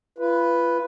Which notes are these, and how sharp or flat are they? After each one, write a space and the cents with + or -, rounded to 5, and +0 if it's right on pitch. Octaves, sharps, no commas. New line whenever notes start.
F4 -35 B4 +0